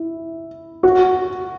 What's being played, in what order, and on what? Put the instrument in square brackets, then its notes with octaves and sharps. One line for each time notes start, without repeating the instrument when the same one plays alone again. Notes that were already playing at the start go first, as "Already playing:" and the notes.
Already playing: [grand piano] E4
F#4